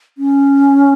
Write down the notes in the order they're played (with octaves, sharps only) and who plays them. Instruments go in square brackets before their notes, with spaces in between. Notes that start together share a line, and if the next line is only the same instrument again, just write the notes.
[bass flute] C#4